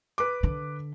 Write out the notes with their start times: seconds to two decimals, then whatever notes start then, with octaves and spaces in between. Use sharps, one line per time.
0.18 B4 D6
0.43 D3